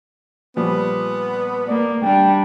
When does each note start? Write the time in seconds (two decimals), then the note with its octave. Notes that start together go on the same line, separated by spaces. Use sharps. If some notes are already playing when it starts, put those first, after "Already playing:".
0.57 A#2 F3 G3 B3
1.68 A#3 D5
2.03 G3 D4 G5